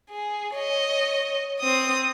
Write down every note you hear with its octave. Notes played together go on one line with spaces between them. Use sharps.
G#4
C#5 D#5
C4 D#6